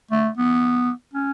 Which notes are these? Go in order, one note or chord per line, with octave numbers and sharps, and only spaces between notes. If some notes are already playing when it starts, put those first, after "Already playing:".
A3
B3
C#4